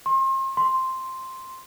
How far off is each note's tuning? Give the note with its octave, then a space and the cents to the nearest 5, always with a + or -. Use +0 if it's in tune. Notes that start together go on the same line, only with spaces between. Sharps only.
C6 +35
C6 +0